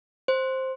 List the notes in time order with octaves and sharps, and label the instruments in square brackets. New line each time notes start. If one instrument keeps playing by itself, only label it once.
[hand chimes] C5